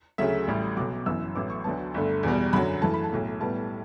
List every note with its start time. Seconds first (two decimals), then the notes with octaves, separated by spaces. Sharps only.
0.18 D2 C#3 F#3 A3 E5
0.47 A1 A2 G3
0.77 B1 B2 F#3 D6
1.06 G1 F#2 E3 E6
1.35 A1 A2 F#3 B3 D6
1.50 C#6
1.64 D2 D3 F#3 B3 A5
1.94 G1 G2 D3 A3
2.23 E2 B2 G3
2.53 F#2 D3 F#3 B5
2.82 F#2 E3 A3 A5
2.94 B5
3.04 A5
3.12 B1 A2 F#3
3.41 B1 A2 G3 B3 A5